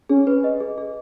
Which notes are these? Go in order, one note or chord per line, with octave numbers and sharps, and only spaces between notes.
C#4 G#4
B4
D#5
G#4
G#4